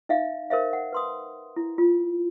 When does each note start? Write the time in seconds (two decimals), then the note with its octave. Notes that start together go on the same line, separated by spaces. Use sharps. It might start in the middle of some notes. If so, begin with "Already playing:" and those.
0.09 D#4 E5 F5
0.50 A#4 C5 E5 F5
0.73 F#5
0.93 B4 C6 D#6
1.56 E4
1.78 F4